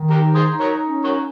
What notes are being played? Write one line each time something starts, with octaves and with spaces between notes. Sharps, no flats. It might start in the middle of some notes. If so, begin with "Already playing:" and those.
Already playing: D#3
D#4 G4 A#4
G#4 C5
D#4
A#4 C#5
C#4
A#4 C#5